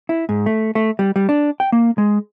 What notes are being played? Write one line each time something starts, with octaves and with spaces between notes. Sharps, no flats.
E4
G#2
A3
A3
G3
G3
D4
G5
A#3
G#3